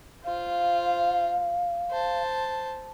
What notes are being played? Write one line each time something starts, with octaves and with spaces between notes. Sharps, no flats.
F4 C5 F5
C5 A5